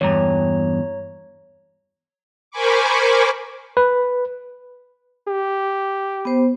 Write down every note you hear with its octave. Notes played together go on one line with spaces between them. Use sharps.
E2 G2 C#5 A#5
A#4 C5 G#5 B5 C#6 D6
B4
G4
B3 C5